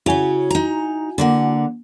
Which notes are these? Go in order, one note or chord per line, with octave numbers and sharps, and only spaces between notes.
C#3 C#4 E4 F#4 G#5
D#4 A#5
D3 A#3 F#5